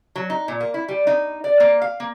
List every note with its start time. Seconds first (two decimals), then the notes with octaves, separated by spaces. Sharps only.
0.15 F#3
0.30 D#4
0.48 A#2
0.61 A#3
0.74 E4
0.89 G3
1.07 D#4
1.44 D5
1.60 A#3
1.82 F5
2.00 A#3